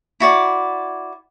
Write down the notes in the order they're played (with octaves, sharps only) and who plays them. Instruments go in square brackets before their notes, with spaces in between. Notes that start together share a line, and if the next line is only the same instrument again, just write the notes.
[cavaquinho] E4 F#4 D5 D6